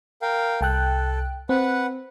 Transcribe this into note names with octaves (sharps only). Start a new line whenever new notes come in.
A#4 F5 G5
C2 A4 G5 F#6
C4 B4 F#5